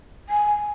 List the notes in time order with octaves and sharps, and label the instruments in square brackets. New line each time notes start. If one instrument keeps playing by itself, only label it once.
[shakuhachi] G#5